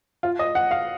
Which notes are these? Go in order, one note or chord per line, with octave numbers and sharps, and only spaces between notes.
F4
D#5
F#5
F5